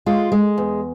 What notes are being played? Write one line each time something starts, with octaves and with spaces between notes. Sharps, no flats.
G#3 F4
G#3
E2